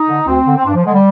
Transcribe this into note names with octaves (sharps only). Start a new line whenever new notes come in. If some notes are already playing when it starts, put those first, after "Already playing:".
Already playing: D#4
D3
D2 C4
D3
C4
G2 D4
F3
D3 G#3
G3